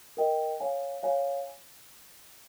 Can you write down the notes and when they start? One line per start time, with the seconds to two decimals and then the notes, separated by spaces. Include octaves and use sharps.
0.17 A#4 D#5 G5
0.60 C#5 F5 G#5
1.03 C#5 F5 G#5